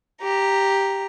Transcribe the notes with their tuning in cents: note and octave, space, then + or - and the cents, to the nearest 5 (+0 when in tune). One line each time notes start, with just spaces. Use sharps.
G4 +0 A#5 +0